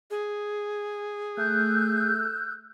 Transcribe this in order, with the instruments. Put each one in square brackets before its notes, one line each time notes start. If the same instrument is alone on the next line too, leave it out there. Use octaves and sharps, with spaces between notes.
[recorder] G#4
[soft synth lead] A3 [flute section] E6 F#6 G6